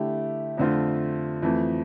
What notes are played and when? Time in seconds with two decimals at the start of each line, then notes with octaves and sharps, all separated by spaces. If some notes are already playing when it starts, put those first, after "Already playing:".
Already playing: D3 A3 E4 G4
0.57 F2 D3 A3 C4 F4
1.42 F2 E3 A3